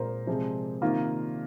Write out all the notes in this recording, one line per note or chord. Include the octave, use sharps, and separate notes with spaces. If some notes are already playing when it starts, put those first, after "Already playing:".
Already playing: A#2 G#3 C4 A#4 C5
C3 F3 G#3
C3 D#3 A#3 F4